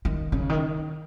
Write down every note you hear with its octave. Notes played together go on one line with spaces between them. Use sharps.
D#3
C#3
D#3